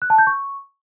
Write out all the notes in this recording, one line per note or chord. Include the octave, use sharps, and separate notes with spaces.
F#6
A5
G6
C#6